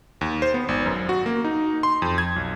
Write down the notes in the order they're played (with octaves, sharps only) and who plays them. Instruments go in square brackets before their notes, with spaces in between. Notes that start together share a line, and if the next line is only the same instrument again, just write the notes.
[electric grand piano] D#2
C5
B3
G#1
F#2
F#4
A#3
D#4
C6
F2
G#6
B1